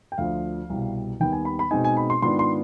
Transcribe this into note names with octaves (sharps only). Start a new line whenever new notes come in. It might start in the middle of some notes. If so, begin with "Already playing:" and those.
G5
D2 D3 F3 F5
C2 B2 G3
D#2 D#3 G3 B3 G5
G#5
B5
B5
B2 G#3 C4 D#4 G#5
G#5
B5
C6
G#2 D#3 B3 D4 F4 C6
C6